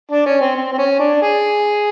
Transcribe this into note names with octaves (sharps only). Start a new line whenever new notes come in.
D4
C#4
C4
C4
C4
C#4
D4
G#4